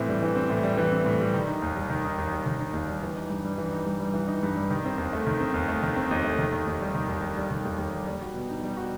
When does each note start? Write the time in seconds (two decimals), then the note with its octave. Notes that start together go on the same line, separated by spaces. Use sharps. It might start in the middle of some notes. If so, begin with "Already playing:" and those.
Already playing: A2 E3 C4
0.09 G3
0.22 E3
0.36 C4
0.50 A2
0.63 G3
0.77 E3
0.92 C4
1.06 A2
1.20 G3
1.34 D#3
1.48 D#4
1.62 D#2
1.75 G3
1.90 D#3
2.04 D#4
2.18 D#2
2.32 G3
2.46 D#3
2.61 D#4
2.74 D#2
2.88 G3
3.02 E3
3.16 D#4
3.30 G2
3.45 G3
3.58 E3
3.72 D#4
3.86 G2
4.00 G3
4.14 E3
4.28 D#4
4.43 G2
4.56 G3
4.70 D#3
4.85 C4
4.98 D#2
5.13 A3
5.27 D#3
5.40 C4
5.54 D#2
5.68 A3
5.83 D#3
5.96 C4
6.11 D#2
6.24 A3
6.38 D#3
6.52 D#2
6.67 D#2
6.80 G3
6.95 D#3
7.08 D#2
7.22 D#2
7.37 G3
7.51 D#3
7.65 D#2
7.78 D#2
7.93 G3
8.07 G3
8.21 F#4
8.34 B2
8.49 D#4
8.63 G3
8.77 F#4